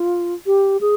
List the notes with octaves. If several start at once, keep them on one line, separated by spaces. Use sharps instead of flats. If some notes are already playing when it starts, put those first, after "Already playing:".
Already playing: F4
G4
G#4